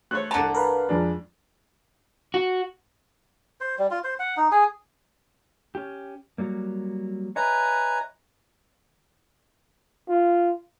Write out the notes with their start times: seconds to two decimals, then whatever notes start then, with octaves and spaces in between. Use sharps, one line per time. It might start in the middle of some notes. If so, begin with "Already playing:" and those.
0.11 A3 C5 C#5 F#6
0.31 C2 D3 F#5 A5 A#5
0.54 A#4 B4 F5
0.89 F2 G#3 D4
2.34 F#4
3.61 C5
3.78 G3
3.91 F4
4.04 C5
4.19 F#5
4.37 D#4
4.51 G#4
5.75 C#4 G4
6.38 F#3 G3 A#3
7.36 B4 C#5 D#5 E5 G#5 A#5
10.09 F4